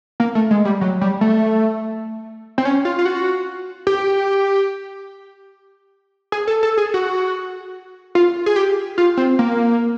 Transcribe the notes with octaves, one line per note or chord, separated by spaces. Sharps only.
A#3
A3
G#3
G3
F#3
G3
A3
C4
C#4
F4
F4
F#4
G4
G#4
A4
A4
G#4
F#4
F4
G#4
G4
F4
C4
A#3